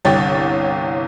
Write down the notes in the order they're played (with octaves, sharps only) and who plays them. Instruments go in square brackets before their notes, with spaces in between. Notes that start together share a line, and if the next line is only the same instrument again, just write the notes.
[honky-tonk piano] G1 C2 C#5 G5 A6